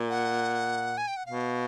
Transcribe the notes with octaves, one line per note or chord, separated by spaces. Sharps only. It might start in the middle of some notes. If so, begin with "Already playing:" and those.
Already playing: A#2
F#5
G#5
G5
F#5
B2 F5